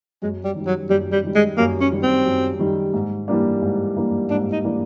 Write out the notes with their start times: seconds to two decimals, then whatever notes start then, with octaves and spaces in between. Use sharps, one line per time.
0.22 F#2 G#3
0.44 G3
0.55 D#3 G3
0.66 F#3
0.89 F#2 G3
1.12 G3
1.24 D#3 G3
1.35 G#3
1.57 F#2 A#3
1.81 C#4
1.92 D#3 G3
2.03 C4
2.26 F#2
2.59 D#3 G3
2.93 G#2
3.28 E3 G3 A#3 D4
3.62 G#2
3.95 E3 G3 A#3 D4
4.30 G#2 D4
4.52 D#4
4.64 E3 G3 A#3 D4